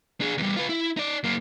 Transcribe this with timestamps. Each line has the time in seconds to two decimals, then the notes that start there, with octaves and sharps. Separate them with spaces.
0.21 D4 G#4
0.38 E2 G3
0.57 F4 B4
0.70 E4
0.97 D#4 D5
1.24 F#2 A#3